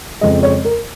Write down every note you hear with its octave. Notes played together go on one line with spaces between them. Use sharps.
F2 C#3 G#3 D#5
C#5
A#4